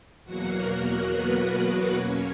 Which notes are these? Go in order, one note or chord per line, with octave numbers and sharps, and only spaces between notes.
E2 B2 F#3 A#3 F#4 F#5
A#3 A#4
A#3 A#4
B3 B4
A#3 A#4
A#3 A#4
E2 B2 F#3 A#3 C#4 C#5